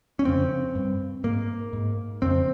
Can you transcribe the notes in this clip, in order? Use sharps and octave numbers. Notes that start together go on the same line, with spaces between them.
C#4
F2 C#3 C4
G2
G#2 A#3
G#2
F2 C#3 C4